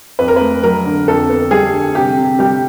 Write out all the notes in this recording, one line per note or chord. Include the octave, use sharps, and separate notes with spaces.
F2 B4
A#4
B4
A3
F#3 A#4
D3
F2 A4
B3
G3 G#4
D3
C3 G4
C3
G3 G4